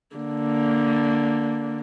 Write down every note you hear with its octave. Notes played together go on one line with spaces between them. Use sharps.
D3 A#3